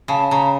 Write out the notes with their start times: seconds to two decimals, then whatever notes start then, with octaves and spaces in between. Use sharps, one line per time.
0.08 C#3 A5
0.31 C#3 A#5